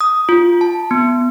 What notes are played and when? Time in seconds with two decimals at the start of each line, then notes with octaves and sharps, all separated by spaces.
0.01 D#6
0.29 F4
0.61 A5
0.91 B3